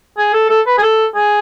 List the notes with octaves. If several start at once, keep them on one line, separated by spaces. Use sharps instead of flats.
G#4
A4
A4
B4
G#4
A4
G#4